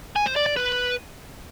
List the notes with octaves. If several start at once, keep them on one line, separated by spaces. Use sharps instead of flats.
G#5
C5
D5
D5
B4